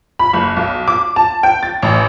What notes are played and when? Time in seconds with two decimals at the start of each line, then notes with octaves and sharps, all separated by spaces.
0.19 B5
0.33 F#1
0.57 B1
0.88 D6
1.16 A5
1.43 G5
1.63 A6
1.82 A1